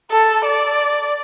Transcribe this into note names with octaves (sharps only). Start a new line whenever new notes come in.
A4
D5